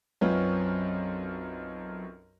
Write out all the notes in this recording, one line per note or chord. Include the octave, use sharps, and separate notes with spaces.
B1 F#2 C4 C#4 F4 B4